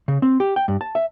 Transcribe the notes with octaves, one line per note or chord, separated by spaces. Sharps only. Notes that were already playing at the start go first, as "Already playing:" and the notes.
C#3
C4
G4
G5
G2
A5
E5